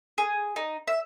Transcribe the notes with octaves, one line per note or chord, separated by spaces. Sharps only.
G#4
D#4
E5